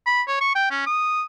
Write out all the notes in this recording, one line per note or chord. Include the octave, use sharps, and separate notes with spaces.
B5
C#5
C#6
G5
C#4
D#6